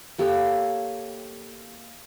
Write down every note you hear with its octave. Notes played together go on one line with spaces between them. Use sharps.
A#3 G4 A4 C#5